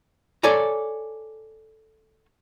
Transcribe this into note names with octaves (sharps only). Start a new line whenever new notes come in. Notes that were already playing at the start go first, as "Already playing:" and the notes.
A4 C#5 D5 G#5 A#5